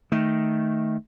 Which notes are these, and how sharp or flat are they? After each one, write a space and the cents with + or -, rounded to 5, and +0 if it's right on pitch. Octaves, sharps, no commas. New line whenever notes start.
D#3 +0 A3 +0